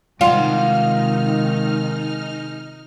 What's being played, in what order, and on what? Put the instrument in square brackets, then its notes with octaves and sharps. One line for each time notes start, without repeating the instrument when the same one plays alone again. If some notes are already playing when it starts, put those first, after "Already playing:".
[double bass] C3 D#3 [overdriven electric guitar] G#3 F#5 [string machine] D#4 F6 [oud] F4